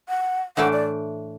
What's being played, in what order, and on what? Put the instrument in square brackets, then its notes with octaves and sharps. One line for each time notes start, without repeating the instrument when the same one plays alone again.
[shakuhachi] F#5
[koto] A2 E3 A3 D4 [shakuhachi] F#5
[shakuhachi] D5